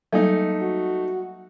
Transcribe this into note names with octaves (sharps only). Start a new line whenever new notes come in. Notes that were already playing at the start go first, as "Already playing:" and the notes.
F#3 G3 A3 A#3 D#4
F#4